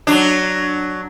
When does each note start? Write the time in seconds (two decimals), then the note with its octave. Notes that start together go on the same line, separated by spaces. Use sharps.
0.07 F#3 D4